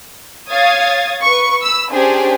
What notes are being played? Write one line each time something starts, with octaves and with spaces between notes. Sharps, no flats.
C#5 F5 D#6 G#6 A6
B4 C#6
B5 E6
C#4 D4 G4 G#4 C5